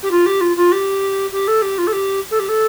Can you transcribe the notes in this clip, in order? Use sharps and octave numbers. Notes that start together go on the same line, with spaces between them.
G4
F4
G4
F4
F4
G4
G4
A4
G4
F4
A4
G4
A4
G4
A4